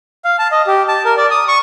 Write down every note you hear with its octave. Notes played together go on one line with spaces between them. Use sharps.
F5
A5
D#5
G4
A5
A#4
D5
D#6
C#6